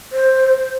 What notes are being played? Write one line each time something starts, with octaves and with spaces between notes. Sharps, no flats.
C5